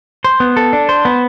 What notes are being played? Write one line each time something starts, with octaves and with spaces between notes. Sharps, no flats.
C5
B3
A4
D4
C5
B3